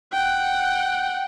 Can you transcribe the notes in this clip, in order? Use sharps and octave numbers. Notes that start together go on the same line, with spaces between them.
F#5 G5